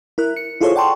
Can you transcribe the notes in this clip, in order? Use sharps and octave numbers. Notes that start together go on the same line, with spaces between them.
E4 A#4 F#6
C#7
E4 F4 G#4 A4 C5 C#5
D5 F#5 G5 A5 C6 C#6